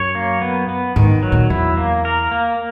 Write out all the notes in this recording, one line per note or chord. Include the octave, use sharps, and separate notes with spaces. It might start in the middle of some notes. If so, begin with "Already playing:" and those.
Already playing: F#2 C#5
A#3
B3
B3
G#2 D#3
F#3
A#2
E2 E4
A#3
A#4
A#3